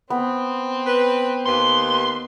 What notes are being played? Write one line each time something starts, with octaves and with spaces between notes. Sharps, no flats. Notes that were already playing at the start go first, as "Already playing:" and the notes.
B3 C4
B4
D#2 B4 C6